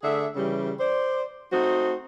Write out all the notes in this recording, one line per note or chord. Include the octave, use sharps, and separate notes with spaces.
D3 A3 G#4 E5
C#3 E3 G3
C5 D5
A3 C4 D#4 F#4 C5